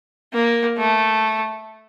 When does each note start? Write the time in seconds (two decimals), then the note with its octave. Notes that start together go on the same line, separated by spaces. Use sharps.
0.33 A#3
0.78 A3